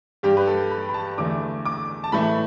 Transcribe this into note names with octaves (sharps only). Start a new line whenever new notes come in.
G2 G3 G4
B4
A4
B5
B5
A5
E2 D3 A3 D6
D6
A5
A2 E3 A3 B5